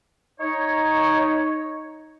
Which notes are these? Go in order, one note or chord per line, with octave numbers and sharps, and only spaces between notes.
D#4 C#5